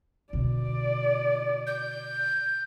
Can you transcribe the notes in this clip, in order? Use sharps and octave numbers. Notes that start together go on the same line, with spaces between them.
B2 D3 D5
G6